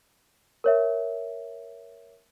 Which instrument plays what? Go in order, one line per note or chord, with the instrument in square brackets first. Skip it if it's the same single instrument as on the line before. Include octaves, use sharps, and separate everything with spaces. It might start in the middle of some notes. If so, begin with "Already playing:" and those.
[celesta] A#4 C#5 E5